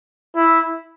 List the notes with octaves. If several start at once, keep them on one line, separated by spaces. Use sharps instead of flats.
E4